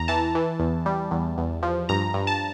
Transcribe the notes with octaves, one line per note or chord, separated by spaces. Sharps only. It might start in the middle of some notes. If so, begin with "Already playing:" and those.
Already playing: E2 A#5
E3 A5
E3
E2
G3
E2
E2
F3
G2 A#5
G2
A5